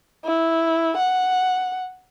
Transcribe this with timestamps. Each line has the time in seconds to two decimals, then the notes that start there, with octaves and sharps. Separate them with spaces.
0.25 E4
0.97 F#5